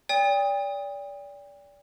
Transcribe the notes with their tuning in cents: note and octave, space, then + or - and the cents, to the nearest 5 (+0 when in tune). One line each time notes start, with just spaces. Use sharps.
D5 -30 G5 +35 D#6 +10